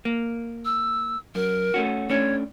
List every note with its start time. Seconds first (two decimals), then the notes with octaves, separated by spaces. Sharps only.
0.05 A#3
0.65 E6
1.35 F#2 A#4
1.74 A3 C#4 F#4
2.10 A3 C#4 D4 C#5